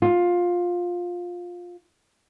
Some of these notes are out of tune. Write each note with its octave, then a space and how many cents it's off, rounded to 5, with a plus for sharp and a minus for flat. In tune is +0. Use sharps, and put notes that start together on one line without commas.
F4 +15